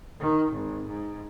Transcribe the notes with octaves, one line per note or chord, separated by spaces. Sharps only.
D#3
G#1
G#2